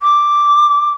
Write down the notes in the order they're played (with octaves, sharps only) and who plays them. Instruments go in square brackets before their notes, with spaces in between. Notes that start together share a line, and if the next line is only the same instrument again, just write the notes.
[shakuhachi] D6